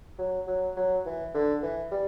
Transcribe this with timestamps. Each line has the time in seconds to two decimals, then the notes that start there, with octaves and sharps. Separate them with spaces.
0.18 F#3
0.47 F#3
0.77 F#3
1.06 E3
1.34 D3
1.63 E3
1.91 G3